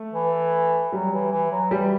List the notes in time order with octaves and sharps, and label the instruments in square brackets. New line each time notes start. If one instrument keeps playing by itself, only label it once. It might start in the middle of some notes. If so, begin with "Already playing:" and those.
Already playing: [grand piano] A3
[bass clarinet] E3
[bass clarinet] F#3 [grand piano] G3
[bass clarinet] E3
E3
F#3
[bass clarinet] E3 [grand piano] G3